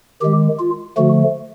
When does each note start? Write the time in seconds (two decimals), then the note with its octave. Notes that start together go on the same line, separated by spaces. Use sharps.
0.22 D#3 G#3 G4
0.59 F4
0.97 D3 F3 A3 F#4